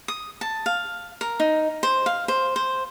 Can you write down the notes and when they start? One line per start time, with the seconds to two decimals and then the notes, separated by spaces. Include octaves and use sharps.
0.08 D#6
0.41 A5
0.66 F5
1.21 A#4
1.40 D#4
1.83 C5
2.06 F5
2.28 C5
2.56 C5